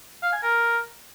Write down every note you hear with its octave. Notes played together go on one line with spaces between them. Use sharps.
F5
G#5
A#4